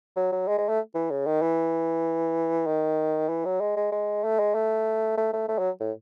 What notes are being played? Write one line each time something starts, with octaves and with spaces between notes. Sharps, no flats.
F#3
F#3
G#3
G#3
A3
E3
C#3
D#3
E3
D#3
E3
F#3
G#3
G#3
G#3
A3
G#3
A3
A3
A3
A3
F#3
A2